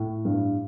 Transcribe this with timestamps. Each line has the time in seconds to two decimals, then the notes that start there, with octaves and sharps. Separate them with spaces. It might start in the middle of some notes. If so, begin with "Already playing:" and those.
Already playing: A2
0.25 G2